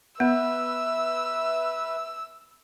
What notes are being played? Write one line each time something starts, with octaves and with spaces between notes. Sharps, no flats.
B3 B4 E5 E6